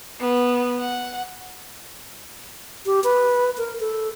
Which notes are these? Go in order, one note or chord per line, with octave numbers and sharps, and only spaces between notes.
B3
F#5
G4
B4
A#4
A4